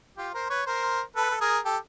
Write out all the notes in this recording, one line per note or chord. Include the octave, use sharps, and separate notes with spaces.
F4 G4
A#4 C5
B4 C#5
A#4 C5
A4 B4
A4
G#4 A#4
G4 A4